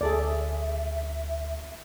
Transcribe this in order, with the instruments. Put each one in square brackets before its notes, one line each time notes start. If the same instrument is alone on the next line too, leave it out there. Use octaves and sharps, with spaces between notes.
[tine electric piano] D2 [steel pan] G#4 A4 D5 [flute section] E5